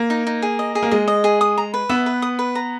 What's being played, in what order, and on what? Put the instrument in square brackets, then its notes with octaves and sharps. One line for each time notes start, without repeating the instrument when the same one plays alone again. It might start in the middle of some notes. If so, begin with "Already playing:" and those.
Already playing: [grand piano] A#3
[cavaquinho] D#4
D#4
G#4
D#5
G#4
[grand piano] A#3
[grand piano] G#3 [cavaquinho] D#5
[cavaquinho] D#5
G#4
D#6
A#5
B4
[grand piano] B3 [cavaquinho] E5
[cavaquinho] B4
D#6
B4
A#5